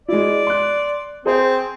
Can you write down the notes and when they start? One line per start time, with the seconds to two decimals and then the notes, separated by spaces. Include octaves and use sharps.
0.08 G#3 E4 D5
0.47 C6 F#6
1.25 C4 G#4 C5